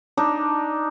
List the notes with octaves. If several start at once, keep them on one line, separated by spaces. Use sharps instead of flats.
D4 D#4